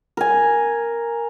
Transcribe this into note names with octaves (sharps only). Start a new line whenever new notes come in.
A#4 G#5